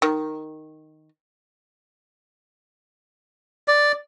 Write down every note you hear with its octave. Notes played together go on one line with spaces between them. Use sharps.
D#3
D5